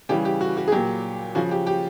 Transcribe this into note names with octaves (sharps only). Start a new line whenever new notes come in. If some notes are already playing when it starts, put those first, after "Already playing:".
C#3 E3 G3 G4
G4
F#4
F#4
G#4
A#2 F#3 G4
C#3 F3 F#4
G4
G4